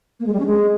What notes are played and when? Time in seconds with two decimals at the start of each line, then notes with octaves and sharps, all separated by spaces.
0.19 A#3
0.26 G#3
0.33 G3
0.39 C#4
0.46 G#3